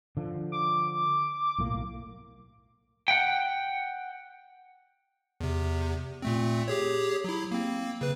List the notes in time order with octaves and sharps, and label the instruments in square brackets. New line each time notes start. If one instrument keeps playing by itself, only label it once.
[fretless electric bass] D3 F3
[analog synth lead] D6
[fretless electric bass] B1 A2 A#3
[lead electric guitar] F#5 G5
[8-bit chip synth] E2 C3
A#2 A3 C4
G4 G#4 C#5
F#3 E4
A#3 C4
C#3 B4